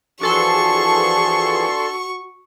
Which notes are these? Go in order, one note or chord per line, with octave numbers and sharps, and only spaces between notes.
E3 F3 D4 F#4 G#4 A4 C6 C#6